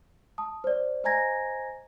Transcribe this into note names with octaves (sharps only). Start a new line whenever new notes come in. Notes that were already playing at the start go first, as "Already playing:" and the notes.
A5 D#6
C5 D5
C5 D#5 G#5 A#5 G#6 A#6